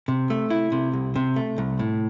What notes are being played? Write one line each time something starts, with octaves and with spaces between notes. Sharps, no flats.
C3
A3
E4
C3
C2
C3
A3
C2
A2